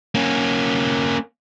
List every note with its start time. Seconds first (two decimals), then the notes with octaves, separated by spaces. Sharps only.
0.15 A#3 C#4